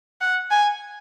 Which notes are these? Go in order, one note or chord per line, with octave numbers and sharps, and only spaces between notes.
F#5
G#5